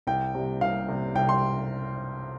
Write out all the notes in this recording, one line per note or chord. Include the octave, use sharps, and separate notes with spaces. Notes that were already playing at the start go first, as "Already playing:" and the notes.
C2 G5
C3 G3
C2 F5
C3 G3
C2 G5
C6